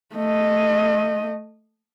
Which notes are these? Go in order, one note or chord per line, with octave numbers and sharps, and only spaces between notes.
A3 D#5